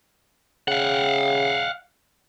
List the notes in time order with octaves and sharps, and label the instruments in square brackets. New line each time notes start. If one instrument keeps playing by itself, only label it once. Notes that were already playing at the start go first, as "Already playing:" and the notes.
[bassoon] C#3 [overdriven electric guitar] F5 F#5